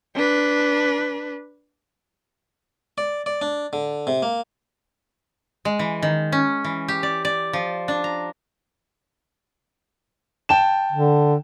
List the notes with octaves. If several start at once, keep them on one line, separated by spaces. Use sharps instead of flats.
D4 B4
D5
D5
D4
D3
C3
A#3
G#3
E3
D#3
C#4
E3
G4
D5
D5
F3
D4
A#5
G5 A5 E7
D3